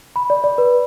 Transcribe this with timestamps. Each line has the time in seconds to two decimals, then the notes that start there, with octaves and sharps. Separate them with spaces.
0.16 B5
0.30 D5
0.44 D5
0.58 B4